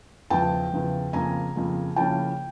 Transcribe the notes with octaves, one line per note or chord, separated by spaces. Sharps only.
E2 C#3 F3 G5 A5
E2 C#3 F3
F2 C#3 F3 A#3 G#5 A#5
F2 C#3 F3 A#3
C#3 F3 A#3 C#4 E4 G5 A5